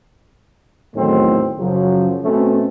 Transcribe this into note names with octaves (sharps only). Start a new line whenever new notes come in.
E2 A2 D#3 F#3 A3 C4
F#2 C#3 F3 F#3
B2 A3 C4 C#4